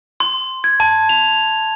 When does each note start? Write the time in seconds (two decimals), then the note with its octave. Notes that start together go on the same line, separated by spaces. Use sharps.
0.20 C6
0.64 G#6
0.80 A5
1.09 F7